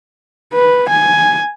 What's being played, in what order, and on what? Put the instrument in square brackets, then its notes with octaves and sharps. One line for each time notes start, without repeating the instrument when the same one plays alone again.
[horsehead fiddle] B4
G#5